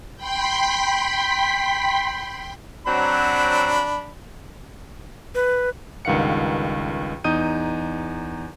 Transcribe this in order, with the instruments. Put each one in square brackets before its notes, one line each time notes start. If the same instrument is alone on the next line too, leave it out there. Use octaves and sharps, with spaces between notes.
[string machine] G5 B5 C6 B6
[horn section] F#3 C4 [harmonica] D4 B5
[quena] B4
[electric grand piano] C#2 G2 D#3 F5 F#5 C#7
E2 D#4 D#6 G6 D#7